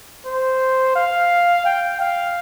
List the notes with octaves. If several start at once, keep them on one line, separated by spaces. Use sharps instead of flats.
C5
F5
G5
F5